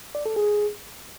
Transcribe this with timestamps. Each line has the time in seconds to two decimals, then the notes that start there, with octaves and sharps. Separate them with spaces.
0.15 D5
0.26 A4
0.36 G#4